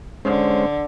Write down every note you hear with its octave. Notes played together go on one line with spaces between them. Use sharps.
D3 G#3 C#4 C5